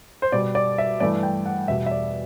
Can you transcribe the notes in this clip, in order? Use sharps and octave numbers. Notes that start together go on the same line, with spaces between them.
C5
B2 G3 D5
D5
E5
G2 E3 A3 D5
G5
F#5
E2 B2 G3 E5
E5
D5